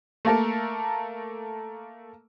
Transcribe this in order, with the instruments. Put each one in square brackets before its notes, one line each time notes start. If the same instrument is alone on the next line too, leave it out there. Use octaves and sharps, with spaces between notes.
[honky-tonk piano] A3 A#3 A4 A#4